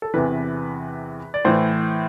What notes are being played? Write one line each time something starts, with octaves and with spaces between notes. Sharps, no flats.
A4
E2 C3 E3 B4
D5
A2 E3 C5